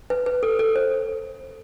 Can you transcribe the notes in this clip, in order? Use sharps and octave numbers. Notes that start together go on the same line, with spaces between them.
B4
B4
A4
A4
C5